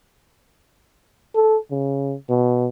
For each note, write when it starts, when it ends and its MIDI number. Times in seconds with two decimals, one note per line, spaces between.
1.35 1.57 69
1.71 2.15 49
2.29 2.68 47